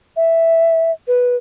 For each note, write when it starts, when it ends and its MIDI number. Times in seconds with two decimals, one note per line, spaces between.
0.16 0.91 76
1.07 1.36 71